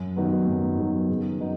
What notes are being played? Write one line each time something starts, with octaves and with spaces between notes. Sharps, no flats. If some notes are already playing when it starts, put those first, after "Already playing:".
Already playing: F#2
D#3 F#3 B3
F#2
D#3 F#3 B3
C#3
F#3 B3 D#4